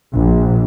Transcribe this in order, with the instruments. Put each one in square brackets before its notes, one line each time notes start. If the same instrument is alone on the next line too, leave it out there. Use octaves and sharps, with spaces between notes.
[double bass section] A#1